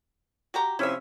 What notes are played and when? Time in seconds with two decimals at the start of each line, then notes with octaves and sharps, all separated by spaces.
0.54 F#4 G4 A#5
0.79 C3 F3 C#4 E4 E5